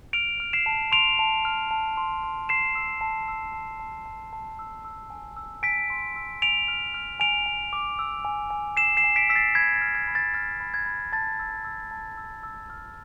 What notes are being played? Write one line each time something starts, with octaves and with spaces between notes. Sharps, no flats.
F6 D7 F7
F6
C7 E7
A5
C6 D7 F7
A5
F6
A5
C6
C6
C6 C7 E7
E6
A5
E6
A5
A5
A5
A5
E6
E6
G#5
E6
G#5 B6 D7
C6
E6
G#5 D7 F7
F6
F6
G#5 D7 F7
G#5
D6
E6
G#5
G#5
E6 C7 E7
C7 E7
G#5
B6 D7
E6 B6
A6 C7
B5 G#6 B6
A6
F6
G#6
B5
A6
F6 A6
B5
G#6
B5
A5 A6
E6
E6
A5
E6
E6
F6